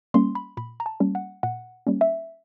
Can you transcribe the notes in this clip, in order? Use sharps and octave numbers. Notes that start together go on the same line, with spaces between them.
G3 A#3 C#4 C6
B5
A#2 B5
A#5
A5
G3 A#3 C#4
F#5
A#2 F#5
G3 A#3 C#4
E5